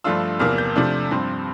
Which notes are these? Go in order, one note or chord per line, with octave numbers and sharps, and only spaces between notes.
G2 F3 A3 D4 F4 E6
E2 C3 F3 A#3 F6
G6
C3 F3 A3 D4
G2 F3 C4